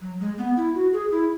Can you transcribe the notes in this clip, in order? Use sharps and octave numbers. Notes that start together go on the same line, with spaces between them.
F#3
G#3
B3
E4
F#4
G#4
E4